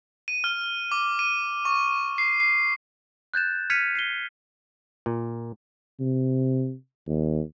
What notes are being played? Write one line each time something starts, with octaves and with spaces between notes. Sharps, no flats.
D#7
F6
D6
D#7
C#6
C7
C7
F#6 G6 A6 E7
F6 G#6 B6 C#7 D#7 F7
C7 D#7 G7
A#2
C3
D#2